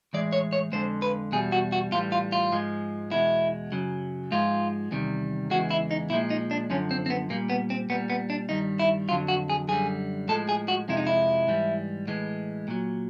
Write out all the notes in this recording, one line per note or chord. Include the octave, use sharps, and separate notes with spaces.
A2 E3 G#3 D5
C#5
C#5
F2 D3 F3 G#3 C5
B4
E2 B2 G3 G#4
F#4
F#4
A2 E3 G3 F4
F4
F4
G#2 F3 G#3
E2 B2 G#3 E4
F#2 C#3 F#3
G#2 F3 G#3 F4
E2 C3 D#3 G3
E2 C#3 E3 G#3 F#4
E4
D#4
A#2 F3 G#3 E4
D#4
D4
F#2 D3 F3 C#4
C4
C4
B3
A#2 G3 A#3
B3
C4
A#2 G3 B3
B3
D4
G2 D#3 G3 D#4
E4
F2 D3 F#3 F4
F#4
G#4
F#2 D3 G3 G#4
A2 F3 G#3 A4
G#4
F#4
F2 C3 F3 G#3 E4
D#4
E4
G#2 E3 G3
A2 E3 G#3
A#2 F#3